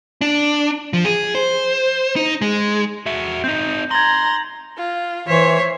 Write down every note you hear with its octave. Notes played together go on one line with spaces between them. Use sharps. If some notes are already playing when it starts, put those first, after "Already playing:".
D4
F3
G#4
C5
D#4
G#3
F#4 E5
C4 D#4 G6
A#5 C6 G#6 A6 F#7
F4
E3 C5 C#5 E5